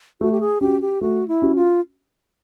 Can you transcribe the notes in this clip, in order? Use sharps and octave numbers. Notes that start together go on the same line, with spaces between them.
A3 F#4
G4
G#4
C#4 F#4 G4
G4
A3 F#4
E4
C#4 F#4
F4